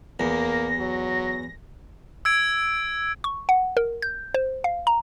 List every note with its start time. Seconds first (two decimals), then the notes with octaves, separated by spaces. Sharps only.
0.20 E2 A#3 A#6
0.78 F#3
2.25 E6 G#6 D7
3.24 C#6
3.49 F#5
3.77 A#4
4.02 G6
4.34 C5
4.64 F5
4.87 A#5